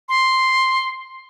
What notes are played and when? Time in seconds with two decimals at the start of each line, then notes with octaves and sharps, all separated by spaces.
0.09 C6